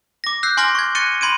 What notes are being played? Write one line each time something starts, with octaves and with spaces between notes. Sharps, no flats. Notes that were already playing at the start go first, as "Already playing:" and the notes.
D6 A#6
E6 F#6 G6 C7
G#5 C6 D6 F6 A#6 F#7
C#6 G#6
C#6 F#6 A6 A#6 C#7 D#7
B5 C6 G#6 D7 D#7